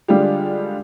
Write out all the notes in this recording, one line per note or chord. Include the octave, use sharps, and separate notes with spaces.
D3 G3 G#3 F4 G4